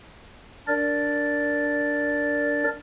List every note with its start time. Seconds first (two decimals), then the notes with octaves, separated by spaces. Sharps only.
0.68 D4 A#4 D5